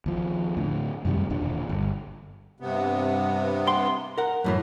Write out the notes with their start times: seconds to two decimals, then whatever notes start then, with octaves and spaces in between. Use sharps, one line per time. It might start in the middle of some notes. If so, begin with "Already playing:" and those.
0.06 D#2 F3
0.57 A2 D3
1.05 F#2 C3 D#3 G3
1.30 E1 D#2 A#2 D4
1.69 G1
2.60 G2 C3 B3
3.67 G5 C6
4.18 A#4 F#5
4.44 F#2 A2 E3